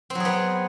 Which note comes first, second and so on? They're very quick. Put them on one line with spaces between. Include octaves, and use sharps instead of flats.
C4 F#3 G#4 B3